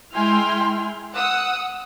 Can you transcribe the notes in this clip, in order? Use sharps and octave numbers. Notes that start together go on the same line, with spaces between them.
G#3 E4 G5 G#5 C6 F6
F#5 D#6 E6